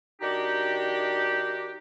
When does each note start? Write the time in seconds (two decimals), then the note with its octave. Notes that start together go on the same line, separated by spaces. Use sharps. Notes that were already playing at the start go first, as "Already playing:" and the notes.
0.21 D#3 D4 D#4 F#4 G4